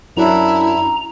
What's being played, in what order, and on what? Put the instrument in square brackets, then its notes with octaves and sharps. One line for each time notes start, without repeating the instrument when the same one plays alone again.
[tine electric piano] F#2 F#3 D4 [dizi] E4 [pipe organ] A#5